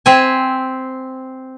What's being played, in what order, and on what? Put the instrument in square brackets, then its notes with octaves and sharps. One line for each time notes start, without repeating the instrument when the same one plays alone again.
[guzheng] C4 E5 G#5